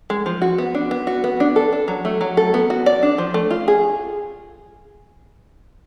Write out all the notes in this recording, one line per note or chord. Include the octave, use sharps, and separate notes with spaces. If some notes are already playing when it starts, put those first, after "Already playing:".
G#3
F3
F#4
B3
D4
B3
F#4
B3
D4
A4
D4
F#3
A3
F#3
A4
B3
F#4
D5
D4
F3
A3
F4
G#4